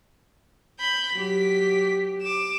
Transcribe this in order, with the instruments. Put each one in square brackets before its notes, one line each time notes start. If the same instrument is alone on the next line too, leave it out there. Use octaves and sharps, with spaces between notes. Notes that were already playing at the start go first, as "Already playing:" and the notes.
[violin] B5 G6
[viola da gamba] F#3 G4 [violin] B6
[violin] D6 E7